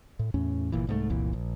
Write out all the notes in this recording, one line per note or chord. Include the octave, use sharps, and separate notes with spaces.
A2
E2 A2 C#4
G1 A#2 E3
C2 G#2 C#3 A3
F1 C2 A#2 E3
A#1